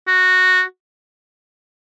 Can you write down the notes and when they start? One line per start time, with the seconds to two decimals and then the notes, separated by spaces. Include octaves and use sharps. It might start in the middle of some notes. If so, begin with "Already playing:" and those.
0.08 F#4